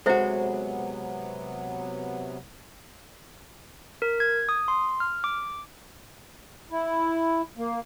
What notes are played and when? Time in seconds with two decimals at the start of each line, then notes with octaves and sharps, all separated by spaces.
0.06 C3 F#3 G#3 B3 F#4 A4 C5 E5
4.02 A#4
4.20 G#6
4.49 D#6
4.68 C6
5.00 F6
5.24 D6
6.71 E4
7.58 A#3